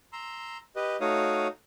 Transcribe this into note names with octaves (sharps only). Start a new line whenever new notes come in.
A#5 C6 E6
G4 B4 D#5
A3 D#4 F#4 C#5 F5 D#6